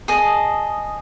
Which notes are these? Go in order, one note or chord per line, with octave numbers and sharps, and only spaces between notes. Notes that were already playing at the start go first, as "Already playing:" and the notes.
G#4 D#5 A5